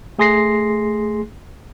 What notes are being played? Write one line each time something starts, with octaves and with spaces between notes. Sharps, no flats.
A3 G#4 C6 A#6 C7